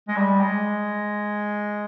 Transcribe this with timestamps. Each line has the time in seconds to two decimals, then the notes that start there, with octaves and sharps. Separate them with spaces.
0.08 G#3
0.16 G3
0.40 G#3